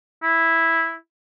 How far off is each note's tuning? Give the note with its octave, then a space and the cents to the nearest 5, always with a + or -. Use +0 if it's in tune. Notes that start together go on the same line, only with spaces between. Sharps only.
E4 -5